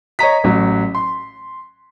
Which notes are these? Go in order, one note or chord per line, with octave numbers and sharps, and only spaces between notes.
C#5 D#5 A#5 B6
A1 F#3
C6